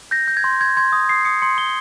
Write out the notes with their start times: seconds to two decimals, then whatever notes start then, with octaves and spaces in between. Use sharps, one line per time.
0.11 G6 A#6
0.28 G6
0.37 G#6
0.44 C6
0.61 C6 G#6
0.77 C6 G#6
0.92 D#6
1.09 D#6 C7
1.25 D#6 C#7
1.42 C6 C#7
1.58 C6 G7